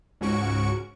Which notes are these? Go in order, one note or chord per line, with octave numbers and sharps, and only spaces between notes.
C#2 G#2 C#4 F#4 C#6 D7